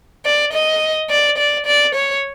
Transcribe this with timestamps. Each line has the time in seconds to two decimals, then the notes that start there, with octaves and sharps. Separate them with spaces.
0.25 D5
0.53 D#5
1.10 D5
1.38 D5
1.66 D5
1.95 C#5